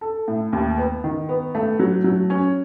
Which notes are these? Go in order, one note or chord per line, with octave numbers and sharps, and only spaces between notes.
A4
A2
D#2
B3
D#3
B3
A3
F#3
F#3
C#4